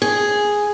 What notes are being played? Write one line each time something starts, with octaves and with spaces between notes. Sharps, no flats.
G#4